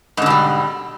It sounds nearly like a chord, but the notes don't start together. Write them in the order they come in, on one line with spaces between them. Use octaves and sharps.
G#2 D3 B2 G3